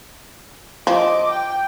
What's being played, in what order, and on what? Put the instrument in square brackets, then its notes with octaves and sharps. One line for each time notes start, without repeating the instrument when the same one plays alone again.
[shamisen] F3 [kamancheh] D#5 D6
[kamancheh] G5